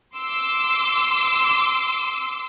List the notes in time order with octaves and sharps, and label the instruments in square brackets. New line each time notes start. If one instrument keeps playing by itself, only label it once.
[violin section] C6 D6 E6